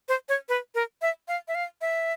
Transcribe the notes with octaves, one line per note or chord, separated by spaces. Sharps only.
C5
C#5
B4
A#4
E5
F5
E5
F5
E5